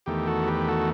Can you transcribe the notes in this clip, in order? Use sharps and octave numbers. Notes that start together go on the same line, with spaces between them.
E2 D#3 A3 G4
F#4 A4
G4 B4
F#4 A4